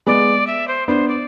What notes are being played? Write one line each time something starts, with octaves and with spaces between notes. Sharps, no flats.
G#3 B3 D5
E5
C5
B3 D4 C5
D5